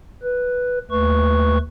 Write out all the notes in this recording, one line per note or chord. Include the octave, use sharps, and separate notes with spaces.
B4
D#2 A3 B4 C#6